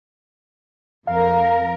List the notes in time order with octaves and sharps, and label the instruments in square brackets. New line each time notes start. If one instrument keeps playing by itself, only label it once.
[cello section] F2 A#4 [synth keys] F5